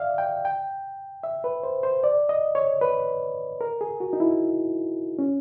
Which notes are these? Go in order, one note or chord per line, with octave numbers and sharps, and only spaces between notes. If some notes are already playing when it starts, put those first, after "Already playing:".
Already playing: D5 E5 F5
G5
G5
E5
B4
C5
C5
D5
D#5
C#5
B4
A#4
G#4
F#4
D#4
E4
C#4